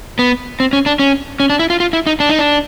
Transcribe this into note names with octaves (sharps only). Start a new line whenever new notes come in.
B3
C4
C#4
D4
C#4
C#4
D4
E4
F4
F4
E4
D#4
D4
D#4
D4